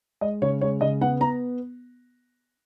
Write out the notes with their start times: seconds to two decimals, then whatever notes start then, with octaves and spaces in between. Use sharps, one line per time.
0.21 G#3 D#5
0.42 C#3 C#5
0.61 G#3 C#5
0.81 C#3 D#5
1.01 B3 F#5
1.20 B3 A#5